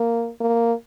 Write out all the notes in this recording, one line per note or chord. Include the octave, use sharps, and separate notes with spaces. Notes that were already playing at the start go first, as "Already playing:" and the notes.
Already playing: A#3
A#3